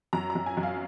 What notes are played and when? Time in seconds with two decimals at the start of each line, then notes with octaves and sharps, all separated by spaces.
0.13 F#2 A#5
0.30 A#5
0.35 F#2
0.46 G#5
0.57 F#2
0.63 F5